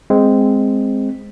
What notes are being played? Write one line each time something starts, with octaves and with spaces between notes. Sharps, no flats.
G#3 C4